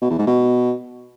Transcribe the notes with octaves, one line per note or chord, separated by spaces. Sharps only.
B2
E2
G#2
B2